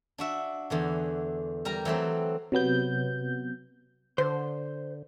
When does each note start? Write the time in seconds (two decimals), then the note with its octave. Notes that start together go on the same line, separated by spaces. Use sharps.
0.18 D4 F#4 E5
0.70 E2 D3 E3
1.65 G3 A#4 A#5
1.85 E3 F#3 A3 C4
2.52 C3 F#3 B3 G6
4.18 D3 C5